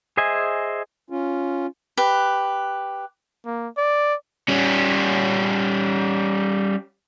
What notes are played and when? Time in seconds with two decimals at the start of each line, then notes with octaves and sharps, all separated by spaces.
0.17 G#4 C5 D#5 E5 G#5
1.10 C#4 F4
1.97 G4 B4
3.46 A#3
3.77 D5
4.48 G3 C#4